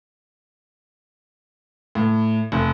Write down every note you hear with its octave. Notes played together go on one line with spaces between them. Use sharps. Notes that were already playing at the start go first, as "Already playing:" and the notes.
A2
F1